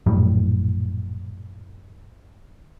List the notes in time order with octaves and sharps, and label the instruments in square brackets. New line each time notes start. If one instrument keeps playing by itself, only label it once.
[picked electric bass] A#1 F#2 A2 G3